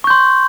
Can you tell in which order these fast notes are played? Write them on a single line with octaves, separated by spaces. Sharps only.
C#6 G6 C6